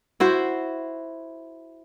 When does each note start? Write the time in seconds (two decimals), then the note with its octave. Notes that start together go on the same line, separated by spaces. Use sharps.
0.20 E4 F#4 C5